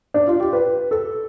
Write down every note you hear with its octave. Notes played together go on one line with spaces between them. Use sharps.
D4
F4
G4
B4
A4